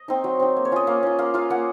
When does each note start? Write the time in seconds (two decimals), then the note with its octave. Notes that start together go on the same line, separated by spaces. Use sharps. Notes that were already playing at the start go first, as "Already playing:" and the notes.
Already playing: D#5
0.08 C4 D#4
0.24 F#3
0.40 C4 D#4
0.56 A#3
0.65 C#5
0.72 C#4 F4 D#5
0.87 A#3 F5
1.03 C#4 F4
1.19 A#3 F5
1.34 F4 F5
1.50 A#3 F#5